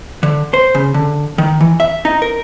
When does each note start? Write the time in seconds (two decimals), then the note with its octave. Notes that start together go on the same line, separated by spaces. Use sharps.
0.23 D3
0.54 C5
0.75 C#3
0.94 D3
1.38 D#3
1.60 E3
1.80 E5
2.05 D#4
2.22 A#4